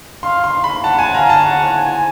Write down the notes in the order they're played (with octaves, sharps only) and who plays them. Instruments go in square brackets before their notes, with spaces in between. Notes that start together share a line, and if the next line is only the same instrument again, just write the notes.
[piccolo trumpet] F5 [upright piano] C6
[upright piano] C6
B5
[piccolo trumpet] F#5 [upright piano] A5
[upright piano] G#5
[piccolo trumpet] F5 [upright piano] A#5
[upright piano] A5
[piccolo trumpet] F#5
G#5